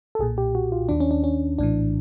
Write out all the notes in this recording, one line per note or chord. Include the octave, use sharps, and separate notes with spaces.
A4
B1 A#2 G#4
G4
F#4
F4
D#2 D#3 D4
C#4
D4
C#4
A#1 A2 E3 D4